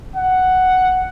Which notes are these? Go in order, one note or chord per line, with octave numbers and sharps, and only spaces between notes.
F#5